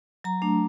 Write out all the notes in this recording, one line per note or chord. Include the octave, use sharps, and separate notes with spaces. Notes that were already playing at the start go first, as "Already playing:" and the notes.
F#3 A#5
A3 D4